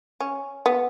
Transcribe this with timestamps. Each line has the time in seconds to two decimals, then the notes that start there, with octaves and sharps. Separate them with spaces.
0.20 C#4
0.66 B3